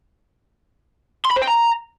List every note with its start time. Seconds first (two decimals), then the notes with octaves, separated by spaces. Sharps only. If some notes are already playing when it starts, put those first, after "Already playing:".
1.25 C6
1.31 B5
1.36 C5
1.42 G5
1.48 A#5